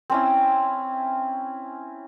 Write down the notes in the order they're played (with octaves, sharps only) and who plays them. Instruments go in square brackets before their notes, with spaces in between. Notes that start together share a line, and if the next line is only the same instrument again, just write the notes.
[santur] C4 C#4 E4